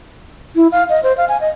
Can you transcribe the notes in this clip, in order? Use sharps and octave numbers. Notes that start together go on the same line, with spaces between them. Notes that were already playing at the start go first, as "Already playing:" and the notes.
E4
F5
D#5
C5
F5
G#5
D#5